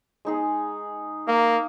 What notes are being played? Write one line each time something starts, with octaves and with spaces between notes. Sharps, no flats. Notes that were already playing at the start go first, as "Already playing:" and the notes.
G#3 D#4 G#4
A#3 F5